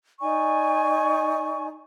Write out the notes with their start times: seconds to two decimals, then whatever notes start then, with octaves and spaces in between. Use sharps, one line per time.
0.20 D#4 D5 G#5 C#6